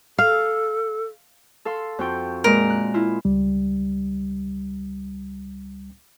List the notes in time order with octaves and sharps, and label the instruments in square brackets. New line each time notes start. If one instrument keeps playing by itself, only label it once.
[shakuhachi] A4 [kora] F5
[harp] A4 F5 C6
F2 F#4 G5
[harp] A#2 G#3 [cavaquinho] A#4
[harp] F#6
E4 F4
[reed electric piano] C#2 G3